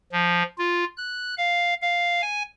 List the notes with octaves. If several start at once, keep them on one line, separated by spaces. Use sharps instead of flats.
F3
F4
F#6
F5
F5
G#5